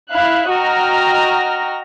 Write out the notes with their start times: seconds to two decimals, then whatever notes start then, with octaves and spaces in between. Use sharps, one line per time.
0.10 E4 F5 F#6
0.49 F#4 D#5 G5 A#5 F6 A#6